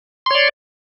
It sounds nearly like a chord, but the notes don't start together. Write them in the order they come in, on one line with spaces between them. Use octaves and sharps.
C6 C#5 D5